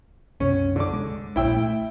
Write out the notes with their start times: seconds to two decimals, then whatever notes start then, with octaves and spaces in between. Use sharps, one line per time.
0.40 C2 F#2 B2 C#4
0.76 D3 D6
0.93 G#3
1.36 A#1 A#2 E4 G5 E6
1.57 A3